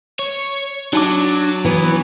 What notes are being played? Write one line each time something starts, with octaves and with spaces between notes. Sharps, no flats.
C#5
F#3 D4 D#4 A5 D6
E3 B3